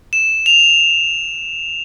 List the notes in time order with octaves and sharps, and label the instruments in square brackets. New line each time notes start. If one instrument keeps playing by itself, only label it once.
[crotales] E7
F7